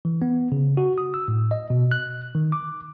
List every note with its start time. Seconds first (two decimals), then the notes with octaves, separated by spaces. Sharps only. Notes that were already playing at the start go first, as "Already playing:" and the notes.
0.05 E3
0.22 B3
0.52 C#3
0.77 F#4
0.98 D#6
1.14 E6
1.28 A2
1.51 D#5
1.70 B2
1.91 F#6
2.35 D#3
2.52 D6